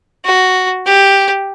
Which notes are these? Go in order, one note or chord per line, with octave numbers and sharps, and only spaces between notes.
F#4
G4